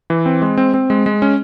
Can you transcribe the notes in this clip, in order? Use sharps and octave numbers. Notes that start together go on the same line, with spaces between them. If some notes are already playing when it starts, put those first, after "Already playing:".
E3
C4
G#3
C4
C4
G#3
G#3
C#4